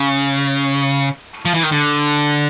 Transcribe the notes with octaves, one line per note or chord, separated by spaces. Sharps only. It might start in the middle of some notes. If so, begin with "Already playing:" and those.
Already playing: C#3
F3
E3
D#3
D3